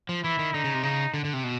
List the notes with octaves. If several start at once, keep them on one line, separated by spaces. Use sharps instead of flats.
F3
E3 E4
D#3
D3 D#4
C#3
C3
C#3 D#4
D3
D3
C3
B2